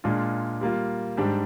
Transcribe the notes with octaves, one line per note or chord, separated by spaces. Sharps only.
A#2 G#3 D4 F4
G3 A#3 F4
G#2 G3 D4 G4